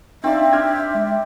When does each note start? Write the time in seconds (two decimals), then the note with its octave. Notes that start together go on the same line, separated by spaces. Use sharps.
0.24 C4 D4 D#4 D5 E5 F5
0.53 D4 G4 C5 F6 G#6
0.95 G#3